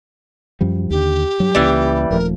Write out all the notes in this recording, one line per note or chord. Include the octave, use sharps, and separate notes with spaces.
F#2 F3 G3
D#2 D3 G4
G2 F#3
C#2 E3 G3 A#3 C#4
D#1 F3 A3 A#4